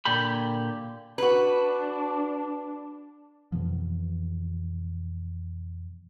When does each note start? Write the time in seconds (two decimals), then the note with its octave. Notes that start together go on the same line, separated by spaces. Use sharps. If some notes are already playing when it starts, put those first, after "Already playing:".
0.05 A#2 D3 G4 B5
1.18 D4 F#4 B4
3.52 F2 B2 E3 F3